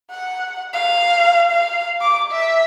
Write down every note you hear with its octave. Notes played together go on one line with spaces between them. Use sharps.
F#5
F5
F5
D6
E5